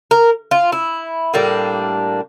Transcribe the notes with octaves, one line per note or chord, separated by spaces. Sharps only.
A#4
F4
E4
A2 G3 A#3 D4